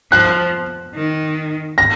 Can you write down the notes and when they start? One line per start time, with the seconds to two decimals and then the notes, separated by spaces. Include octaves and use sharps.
0.12 F3 F#6
0.95 D#3
1.78 A#6